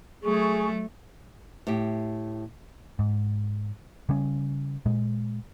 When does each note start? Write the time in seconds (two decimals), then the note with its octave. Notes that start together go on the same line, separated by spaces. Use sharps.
0.23 F#3 A3 G#4 C#6
1.67 A2 G4
2.99 G#2
4.09 C#3 G3 C#4
4.86 A#2 G#3